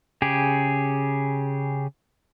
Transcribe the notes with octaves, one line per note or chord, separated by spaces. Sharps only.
C#3 G4 G#4